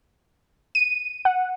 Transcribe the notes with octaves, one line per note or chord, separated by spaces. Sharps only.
D#7
F#5